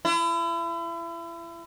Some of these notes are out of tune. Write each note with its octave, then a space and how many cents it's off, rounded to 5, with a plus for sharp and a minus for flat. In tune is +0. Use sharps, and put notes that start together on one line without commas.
E4 +35